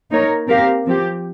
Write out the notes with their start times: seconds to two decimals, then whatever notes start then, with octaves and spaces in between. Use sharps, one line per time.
0.10 A#3 D#4 A#4 C#5
0.48 C4 G4 A#4 F5
0.85 F3 C4 G4